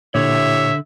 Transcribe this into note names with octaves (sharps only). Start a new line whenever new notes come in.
A#2 D3 E4 G4 C#5 E5